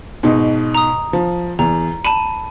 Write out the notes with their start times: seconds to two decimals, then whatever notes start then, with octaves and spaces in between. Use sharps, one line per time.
0.23 G#2 B2 D#4
0.75 A#5 D#6
1.13 F3
1.59 E2 A#5
2.05 A5 B5 D#7